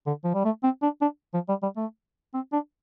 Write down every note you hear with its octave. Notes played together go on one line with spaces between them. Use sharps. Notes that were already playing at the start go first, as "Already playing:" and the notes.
D3
F3
G3
A3
C4
D4
D4
F3
G3
G3
A3
C4
D4